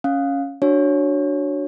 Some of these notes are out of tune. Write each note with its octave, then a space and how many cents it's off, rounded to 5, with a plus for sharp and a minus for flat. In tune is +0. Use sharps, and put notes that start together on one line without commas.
C#4 +0 F5 +10
D4 +0 F#4 +0 C#5 +0